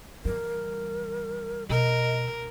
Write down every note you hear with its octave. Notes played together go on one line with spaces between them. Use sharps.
E3 G3 A#4
B2 A#4 D#5